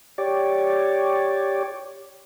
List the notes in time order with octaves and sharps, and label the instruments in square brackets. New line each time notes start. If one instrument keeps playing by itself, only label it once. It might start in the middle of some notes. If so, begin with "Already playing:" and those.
[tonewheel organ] G4 C#5 D5